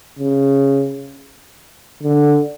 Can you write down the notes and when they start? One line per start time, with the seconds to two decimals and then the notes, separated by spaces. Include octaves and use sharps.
0.19 C#3
2.03 D3